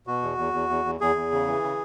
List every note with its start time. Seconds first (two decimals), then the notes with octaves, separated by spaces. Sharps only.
0.07 B2 F#4
0.22 E2
0.38 E2
0.53 E2
0.69 E2
0.85 E2
1.01 E2 G#4
1.16 E2
1.32 C#3
1.47 E3
1.63 C#3